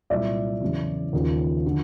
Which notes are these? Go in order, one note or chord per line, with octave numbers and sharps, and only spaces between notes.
C2 A#2 F#3 D5 E5
E2 C#3 F#3
D#2 C#3 F3
D3 F3